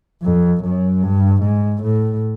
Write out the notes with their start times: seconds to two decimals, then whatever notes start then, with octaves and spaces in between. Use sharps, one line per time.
0.23 F2
0.63 F#2
1.03 G2
1.43 G#2
1.83 A2